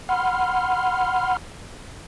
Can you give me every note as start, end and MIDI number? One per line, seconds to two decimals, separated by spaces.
0.09 1.37 78
0.09 1.37 83
0.09 1.37 84
0.09 1.37 89